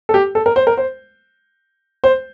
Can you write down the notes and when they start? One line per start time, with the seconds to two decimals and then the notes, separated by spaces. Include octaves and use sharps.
0.09 A4
0.14 G4
0.35 A4
0.46 A#4
0.56 C5
0.67 A#4
0.77 C5
2.04 C5